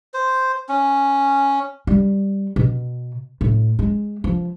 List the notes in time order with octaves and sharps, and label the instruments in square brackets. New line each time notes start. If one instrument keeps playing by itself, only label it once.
[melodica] C5
C#4
[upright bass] G3
B2
A2
G#3
F3